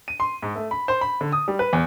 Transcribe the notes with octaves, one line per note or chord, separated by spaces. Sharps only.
D#7
C6
G#2
A3
B5
C5
B5
D3
D#6
G3
B4
E2